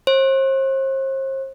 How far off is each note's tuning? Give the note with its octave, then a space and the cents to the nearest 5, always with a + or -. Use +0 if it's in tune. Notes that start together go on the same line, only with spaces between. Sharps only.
C5 +40